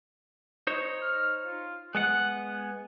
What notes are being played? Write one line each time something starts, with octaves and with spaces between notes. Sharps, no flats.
D#4 C5 C#5
F6
F4
G#3 B3 F#5 F#6
G#5